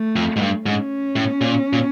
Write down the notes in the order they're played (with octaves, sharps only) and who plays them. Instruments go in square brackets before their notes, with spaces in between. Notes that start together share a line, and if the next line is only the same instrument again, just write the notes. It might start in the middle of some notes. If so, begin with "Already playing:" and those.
Already playing: [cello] A3
[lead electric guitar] F2
G#2
G2
[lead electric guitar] G#2 [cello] C#4
[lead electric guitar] A2
A#2
A#2